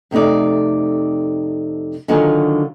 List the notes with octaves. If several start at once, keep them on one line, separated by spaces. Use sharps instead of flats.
F2 C3 A3 D#4 D5
D3 D#3 F#3 F4 G#5